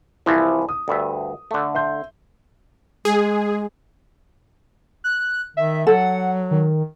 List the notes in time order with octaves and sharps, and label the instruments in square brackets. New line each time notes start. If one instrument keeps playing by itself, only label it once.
[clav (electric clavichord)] C2 E3 F3 [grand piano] E4
[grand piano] D#6
[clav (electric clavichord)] D2 G2 E5
D3 A3
[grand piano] E5 C6 G6
[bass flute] G#3 [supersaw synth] G#4
[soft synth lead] F#6
[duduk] D#3 [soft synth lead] E5
[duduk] F#3 [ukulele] A4 [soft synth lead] F#5
[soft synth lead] D#3